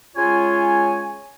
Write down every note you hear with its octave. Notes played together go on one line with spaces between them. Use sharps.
C#3 G#3 F4 C#5 G#5